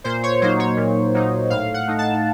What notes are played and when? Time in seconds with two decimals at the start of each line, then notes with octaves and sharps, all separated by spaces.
0.04 A#2 C5
0.23 C#5
0.42 F#3 A#3 D#4 C5
0.60 C#5
0.77 A#2
1.14 F#3 A#3 D#4
1.50 A2 F5
1.74 F#5
1.87 A3 D#4
1.98 A5